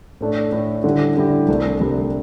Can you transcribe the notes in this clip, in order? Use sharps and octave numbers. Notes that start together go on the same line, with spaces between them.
A2 A3 D4
A2 A3 D4
D3 G3 E4 G4
D3 G3 E4 G4
C2 C3 A3 D4
C2 C3 A3 D4